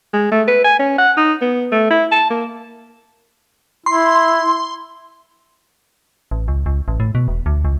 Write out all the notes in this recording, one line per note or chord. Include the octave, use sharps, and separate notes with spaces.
G#3
A3
B4
G#5
C#4
F#5
D#4
B3
A3
E4
A5
A#3
E4 C6
A1
C#2
C#2
A1
A2
B2
E1
D2
C#2